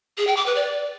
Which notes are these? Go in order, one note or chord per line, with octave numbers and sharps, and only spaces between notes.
G#4
G5
D6
B4
D5